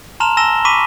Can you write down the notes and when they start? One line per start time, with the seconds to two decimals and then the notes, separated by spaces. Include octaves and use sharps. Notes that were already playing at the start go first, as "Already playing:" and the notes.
0.20 A5 A#5 C6 F6 E7 F7
0.37 G#5 A5 E6 A#6 E7 G7
0.65 B5 C#6 D6 B6 D#7